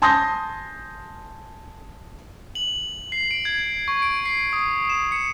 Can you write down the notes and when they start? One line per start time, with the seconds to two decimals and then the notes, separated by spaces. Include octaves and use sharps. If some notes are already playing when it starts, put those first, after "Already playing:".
0.02 G#5 A5 C6 D#6 G6 A#6
2.55 F#7
3.12 C7
3.31 D7
3.45 G#6
3.88 C#6
4.02 D7
4.26 C7
4.53 D#6
4.89 E7
5.12 C#7